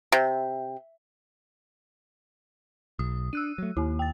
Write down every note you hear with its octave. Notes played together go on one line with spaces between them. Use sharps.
C3
B1 D#6
D4 E6 F#6 D#7
F#3 A3
D#2 A#3 E4
G5 A6